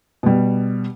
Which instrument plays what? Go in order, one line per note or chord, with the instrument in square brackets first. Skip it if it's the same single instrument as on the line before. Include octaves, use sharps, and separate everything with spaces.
[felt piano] B2 G3